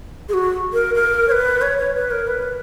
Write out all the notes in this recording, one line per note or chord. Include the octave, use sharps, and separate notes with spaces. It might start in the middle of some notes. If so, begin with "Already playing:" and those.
G#4
F#4
A#4
A#4
C#5
B4
C#5
C#5
B4
A#4
B4